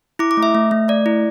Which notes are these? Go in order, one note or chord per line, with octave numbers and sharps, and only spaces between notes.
E4 D6
D6
A3
E5
A3
A3
A3 D5
E4